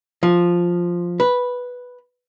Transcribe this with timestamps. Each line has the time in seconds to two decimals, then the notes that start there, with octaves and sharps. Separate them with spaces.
0.23 F3
1.20 B4